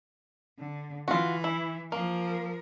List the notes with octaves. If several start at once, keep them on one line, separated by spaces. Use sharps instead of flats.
D3
E3 F4 F#4
E4
F3 A#3 A#4